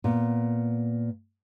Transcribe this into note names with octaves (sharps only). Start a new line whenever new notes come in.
A#2 B3